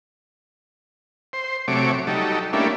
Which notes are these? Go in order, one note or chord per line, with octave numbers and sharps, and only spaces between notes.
C5
C3 F#3 A3 C#5 D6
F#3 G3 D#4 A4
G3 A3 A#3 C#4 D4 E4